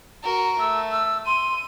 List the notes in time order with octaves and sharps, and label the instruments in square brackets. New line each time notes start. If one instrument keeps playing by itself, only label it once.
[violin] F#4 A#4
[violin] A3 [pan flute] E6
[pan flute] E6
[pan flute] C6 [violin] D#7